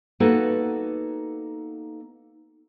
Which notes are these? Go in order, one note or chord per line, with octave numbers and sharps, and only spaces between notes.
A#3 B3 D#4 F#4 A4 B4